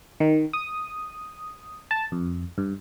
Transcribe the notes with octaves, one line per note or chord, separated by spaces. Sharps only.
D#3
D#6
A5
F2
G2